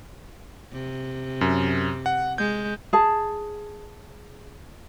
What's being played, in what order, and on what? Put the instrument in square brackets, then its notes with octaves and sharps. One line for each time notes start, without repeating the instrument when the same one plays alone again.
[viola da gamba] C3
[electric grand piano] F#2
F#5
[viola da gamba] G#3 [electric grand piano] G6
[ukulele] G#4 A5